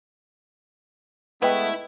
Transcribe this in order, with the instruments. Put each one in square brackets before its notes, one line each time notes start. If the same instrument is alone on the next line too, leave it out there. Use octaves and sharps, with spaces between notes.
[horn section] G#3 A3 B3 [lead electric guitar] E4 [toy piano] B4 D#5 G5